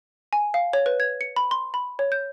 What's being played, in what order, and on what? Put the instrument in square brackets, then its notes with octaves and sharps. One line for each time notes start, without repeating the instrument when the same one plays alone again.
[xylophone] G#5
F5
C#5
B4
G#6
C#7
B5
C6
B5
C#5
G6